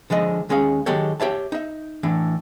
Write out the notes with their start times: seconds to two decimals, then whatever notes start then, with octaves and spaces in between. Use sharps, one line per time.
0.10 D3 F3 G#3 D#5
0.49 D#2 G#3 C#4 G#4 F5
0.86 D#3 F#3 G#3 G4 A4 C#5
1.20 G4 C#5 E5 A5
1.52 D#4 E5
2.03 A2 E3 D4